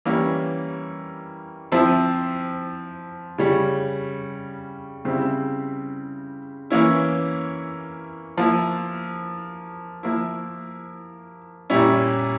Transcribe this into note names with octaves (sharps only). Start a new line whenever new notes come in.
E3 G3 A#3 C#4
F3 C4 E4
C#3 G3 C#4
C#3 G3 C4 E4
E3 A#3 C#4 E4
F3 A#3 E4
F3 A#3 E4
A#2 G3 C#4 E4